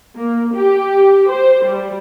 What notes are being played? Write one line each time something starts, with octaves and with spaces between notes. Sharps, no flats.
A#3
G4
C5
G3